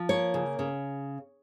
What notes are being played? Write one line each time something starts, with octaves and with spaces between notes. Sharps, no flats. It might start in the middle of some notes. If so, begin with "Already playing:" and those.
Already playing: F3
A#3 C#5
C#3
C#3